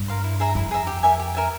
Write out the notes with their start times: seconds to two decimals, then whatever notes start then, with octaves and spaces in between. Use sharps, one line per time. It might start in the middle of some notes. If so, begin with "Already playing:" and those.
Already playing: G2
0.08 A#4 F5 C6
0.24 E4
0.40 G#4 E5 A#5
0.55 F2 E4
0.71 G#4 E5 A#5
0.87 G4
1.03 A#4 E5 G#5
1.19 G4
1.35 A#4 E5 G#5